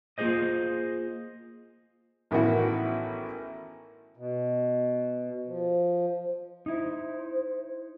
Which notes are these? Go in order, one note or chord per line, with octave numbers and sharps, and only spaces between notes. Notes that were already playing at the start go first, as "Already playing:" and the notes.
A#3 F4 G#4 C5 D#5
A1 D#3 B3 E4 F#4
B2
F3
D#4 E4 C5